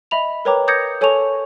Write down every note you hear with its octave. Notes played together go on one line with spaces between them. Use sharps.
D#5 E5 B5 F7
A#4 B4 C#5 G5 A#5 D6
D6 D#6 G6 G#6 A#6 C#7
A4 C#5 G#5 A5 C#6 F7